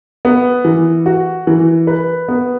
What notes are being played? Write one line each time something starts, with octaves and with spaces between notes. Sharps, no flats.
B3
E3
F#4
E3
B4
B3